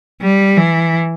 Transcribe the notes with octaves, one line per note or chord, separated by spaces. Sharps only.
G3
E3